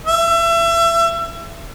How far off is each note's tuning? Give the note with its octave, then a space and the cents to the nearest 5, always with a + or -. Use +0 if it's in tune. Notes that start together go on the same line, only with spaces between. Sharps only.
E5 +30